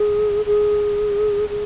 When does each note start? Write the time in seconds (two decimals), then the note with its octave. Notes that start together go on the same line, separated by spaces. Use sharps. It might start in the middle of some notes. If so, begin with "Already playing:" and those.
Already playing: G#4
0.46 G#4
1.49 G#4